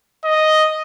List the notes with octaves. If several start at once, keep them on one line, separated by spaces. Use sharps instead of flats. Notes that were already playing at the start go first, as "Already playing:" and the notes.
D#5